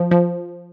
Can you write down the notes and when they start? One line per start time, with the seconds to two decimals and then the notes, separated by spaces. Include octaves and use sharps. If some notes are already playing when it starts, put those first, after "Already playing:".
Already playing: F3
0.11 F3